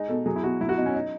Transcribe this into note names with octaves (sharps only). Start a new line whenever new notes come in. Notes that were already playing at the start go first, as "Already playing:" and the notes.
Already playing: G#3 D#4
B2 A4
F#3 G#4
E4
B2 F#4
F#3 E4
F#4
B2 D#4
C#4
D#4